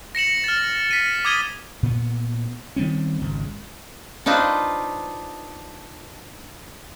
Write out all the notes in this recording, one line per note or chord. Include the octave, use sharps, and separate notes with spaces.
A#6 C#7 E7 F#7
F6 A6
B6 D#7
D6 D#6 G#6 D#7 G7
A#2 B3
D#3 G3 C4 C#4
G#1 C#2
D4 D#4 F4 B4 C5